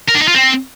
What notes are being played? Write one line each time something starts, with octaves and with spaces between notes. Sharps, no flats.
A#4
D4
D#4
F4
C4